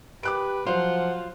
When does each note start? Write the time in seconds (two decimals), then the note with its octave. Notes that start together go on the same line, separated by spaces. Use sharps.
0.23 G4 B4 D6 F#6 D7
0.67 F3 F#3 F4 C5 F#5